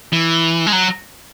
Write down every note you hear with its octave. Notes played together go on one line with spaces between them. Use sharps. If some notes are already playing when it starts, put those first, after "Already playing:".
E3
G#3
F#3